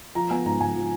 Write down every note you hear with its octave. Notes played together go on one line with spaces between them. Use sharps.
F3 A#5
B3 G#5
G#2 A#5
G#2 G#5
F3